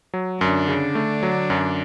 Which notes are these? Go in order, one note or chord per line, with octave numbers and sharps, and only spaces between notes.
F#3
F#2 D3 D4
C#3
A3
F#3
F#2